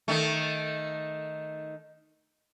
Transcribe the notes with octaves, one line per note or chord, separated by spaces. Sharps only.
D#3 A3